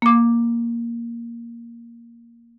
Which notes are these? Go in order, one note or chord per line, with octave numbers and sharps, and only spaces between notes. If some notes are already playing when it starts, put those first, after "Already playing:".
A#3 D6